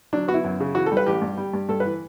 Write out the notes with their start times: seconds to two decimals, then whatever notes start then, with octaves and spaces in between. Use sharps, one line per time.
0.13 F#3 D4
0.28 B3 F#4
0.34 E4
0.44 F#2
0.60 C#3
0.75 E3 F#4
0.86 A4
0.92 G3
0.97 B4
1.07 A1 G4
1.22 G2
1.37 G3
1.53 G2
1.69 G2 A4
1.80 E3 B4